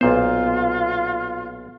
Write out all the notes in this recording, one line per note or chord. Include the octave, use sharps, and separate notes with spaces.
B1 A#2 B3 F4 C5